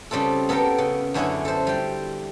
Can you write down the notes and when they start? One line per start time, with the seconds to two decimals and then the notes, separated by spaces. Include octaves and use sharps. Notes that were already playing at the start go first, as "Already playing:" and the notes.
0.11 C#3 G3 C4 F4 A4
0.49 B3 A4 A#4 F5 G5
0.78 C#3
1.14 F#2 D3 C#4 E4 G#4
1.45 A4 C5
1.67 G3 G5